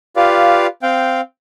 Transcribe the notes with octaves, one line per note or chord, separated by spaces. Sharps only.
F4 G4 B4 D5 F5
C4 F5 G5